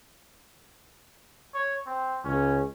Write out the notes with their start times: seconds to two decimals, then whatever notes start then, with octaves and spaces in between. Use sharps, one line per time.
1.54 C#5
1.87 C4
2.25 C#2 C#4